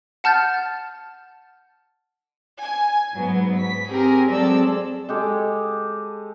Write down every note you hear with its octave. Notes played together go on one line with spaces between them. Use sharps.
F#5 A5 F6 G6 A6
G#5
G#2 F#3 B3
B6
C4 G4 G#4 A#4
F#3 G#3 C4 A4 D5 E6
G#3 G4 A4